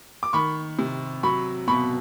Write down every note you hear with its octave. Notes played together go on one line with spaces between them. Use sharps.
D6
D#3 B5 C#6
C3
F#3 B5 C#6
B2 B5 C#6